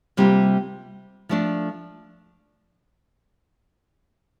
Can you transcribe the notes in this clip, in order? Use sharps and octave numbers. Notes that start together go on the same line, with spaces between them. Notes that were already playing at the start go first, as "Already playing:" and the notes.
C3 G3 A#3 F4
F3 A3 D4